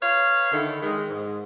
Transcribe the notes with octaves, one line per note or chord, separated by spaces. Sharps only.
B4 C#5 F5
D3 D#3 E4 A4
D#3 G#3
G#2